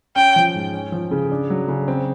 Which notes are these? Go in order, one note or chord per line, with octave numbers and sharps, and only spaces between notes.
C#4 G5
F3
G#2
C#4
F3
C#3
D4
F#3
C#3
C4